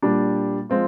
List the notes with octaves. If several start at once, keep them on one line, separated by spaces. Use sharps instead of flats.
A#2 G3 D4
F3 G#3 C4 F4